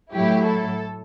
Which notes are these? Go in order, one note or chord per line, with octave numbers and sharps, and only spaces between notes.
A2 F#3 A3 E4 G4
A4